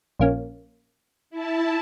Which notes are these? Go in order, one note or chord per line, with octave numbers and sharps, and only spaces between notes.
A#1 A#3 C#4
E4 A5